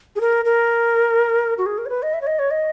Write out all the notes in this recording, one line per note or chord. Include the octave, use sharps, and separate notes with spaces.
G#4
A#4
A#4
F#4
G#4
A#4
C#5
B4
D#5
E5
C#5
D#5
C#5
D#5